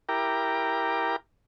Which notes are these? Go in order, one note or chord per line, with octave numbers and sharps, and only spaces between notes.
E4 G4 A#4 G5 A#5 D6